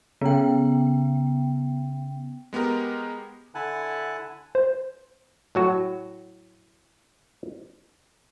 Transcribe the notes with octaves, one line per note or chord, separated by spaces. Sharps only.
C#3 B3 G5
G#3 B3 G4 A#4
D3 E4 F#5 G#5 A5 F#6
C5
A2 F#3 F#4